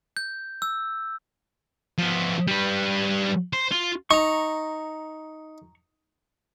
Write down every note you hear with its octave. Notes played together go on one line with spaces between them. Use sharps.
G6
E6
F3 B3
G3 B4
C5
F4
D#4 A#5 C#6